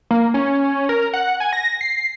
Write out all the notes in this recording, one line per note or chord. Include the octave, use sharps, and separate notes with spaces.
A#3
C#4
A#4
F#5
G#5
A#6
C7